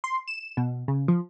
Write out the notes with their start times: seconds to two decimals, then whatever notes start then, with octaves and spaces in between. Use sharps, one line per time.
0.04 C6
0.28 E7
0.57 B2
0.88 C#3
1.08 F3